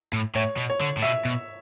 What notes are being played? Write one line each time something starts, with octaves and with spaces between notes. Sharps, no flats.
A2
A2 C#5
B2
C#5
D3
A2
B2 E5
B2